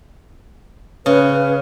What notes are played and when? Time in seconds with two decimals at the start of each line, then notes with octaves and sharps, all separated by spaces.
1.06 C#3 B4